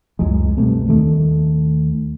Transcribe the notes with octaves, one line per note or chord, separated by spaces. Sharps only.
C#2 F#2 F#3 G#3
B2 G3 A3 C4
D#2 D#3 A3